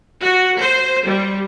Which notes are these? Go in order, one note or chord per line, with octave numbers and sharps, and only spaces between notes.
F#4
C5
G3